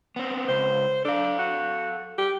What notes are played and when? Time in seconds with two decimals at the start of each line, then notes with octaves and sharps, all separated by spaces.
0.16 B3 C4
0.48 C#2 C5
1.05 D4 A4 F5
1.38 F#4
2.18 G4